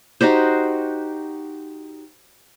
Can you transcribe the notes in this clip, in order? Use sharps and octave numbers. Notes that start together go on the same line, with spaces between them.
D#4 F#4 G4 C5